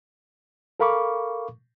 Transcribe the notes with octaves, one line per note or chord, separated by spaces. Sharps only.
A4 A#4 F5 B5 C#6 D6